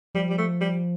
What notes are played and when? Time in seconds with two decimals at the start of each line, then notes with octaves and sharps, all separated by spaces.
0.15 F3 G3
0.30 G3
0.38 A3
0.61 G3